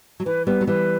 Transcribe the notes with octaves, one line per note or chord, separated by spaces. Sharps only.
F#3
E3 B4
G3 B3 B4
F#3
E3 G3 B4